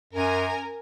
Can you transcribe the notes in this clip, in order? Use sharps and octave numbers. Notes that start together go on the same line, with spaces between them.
F#2 A#4 G#5 A#5